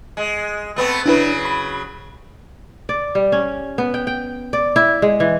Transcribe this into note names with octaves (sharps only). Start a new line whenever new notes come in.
G#3
A3 B3 C4
C#3 F#3 D4 E4 B4
B5
D5
G3
C#4
B3
G5
G5
D5
E4
G#3
E3